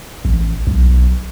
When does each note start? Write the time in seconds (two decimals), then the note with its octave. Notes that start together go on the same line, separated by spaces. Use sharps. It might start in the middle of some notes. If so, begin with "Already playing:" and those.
0.25 A1
0.67 B1